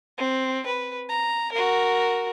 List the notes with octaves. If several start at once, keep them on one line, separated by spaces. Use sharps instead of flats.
C4
B4
A#5
F#4 A#4